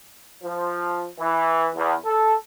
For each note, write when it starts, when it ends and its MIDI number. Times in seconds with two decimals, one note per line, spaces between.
0.43 1.08 53
1.20 1.70 52
1.76 1.94 40
2.06 2.34 69